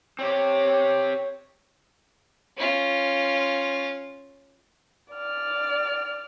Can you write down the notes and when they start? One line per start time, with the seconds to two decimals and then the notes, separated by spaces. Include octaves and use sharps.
0.19 C4 G4 C#5
2.57 C#4 F4
5.13 D5 F6